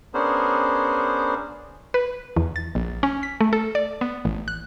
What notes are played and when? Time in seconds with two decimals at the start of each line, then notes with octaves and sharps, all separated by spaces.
0.14 B3 C#4 D4 G#4 A#4 C5
1.94 B4
2.37 E2
2.56 A6
2.75 A#1
3.03 C#4
3.23 B6
3.41 A3
3.53 A4
3.75 D5
4.01 B3
4.25 A1
4.48 F#6